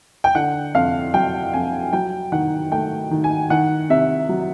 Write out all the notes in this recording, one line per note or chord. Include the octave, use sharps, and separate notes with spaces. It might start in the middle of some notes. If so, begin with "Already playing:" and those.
G5
D3 F#5
F2 F5
F#3 G5
F2 G#5
F#3 G5
D#3 F#5
A3 G5
D#3
G#5
D#3 F#5
C3 E5
F#3